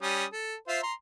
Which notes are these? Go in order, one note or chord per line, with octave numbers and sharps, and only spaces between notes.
G3 C#4 D#6
A4
F4 C5 E5
A#5 C6